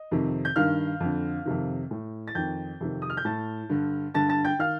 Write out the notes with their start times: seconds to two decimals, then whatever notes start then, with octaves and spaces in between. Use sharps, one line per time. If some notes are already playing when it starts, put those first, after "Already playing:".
Already playing: D#5
0.11 F2 C3 D#3
0.45 G6
0.56 G2 D#3 F5 F6
1.00 F2 D3
1.45 F2 C3 D#3
1.91 A2
2.28 A6
2.35 F2 D#3 G5 G6
2.81 F2 C3 D#3
3.02 D#6
3.10 F6
3.17 G6
3.25 A2 A5 A6
3.69 G2 D3
4.14 G2 D3 A5 A6
4.29 A5 A6
4.44 G5 G6
4.59 D#3 F5 F6